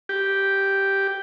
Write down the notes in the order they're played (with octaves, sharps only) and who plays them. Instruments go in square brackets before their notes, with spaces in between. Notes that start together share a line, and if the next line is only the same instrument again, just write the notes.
[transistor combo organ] G4